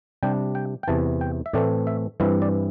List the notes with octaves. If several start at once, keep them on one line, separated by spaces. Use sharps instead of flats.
C3 G3 D4 G5
G5
G5
E2 C3 E3 A5
G5
E5
A2 E3 A3 C4 D5
E5
G2 E3 C4 E4 E5
D5